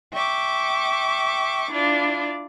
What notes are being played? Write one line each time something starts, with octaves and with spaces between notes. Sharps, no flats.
E5 G5 C#6 D6
D4 E4 F4 D5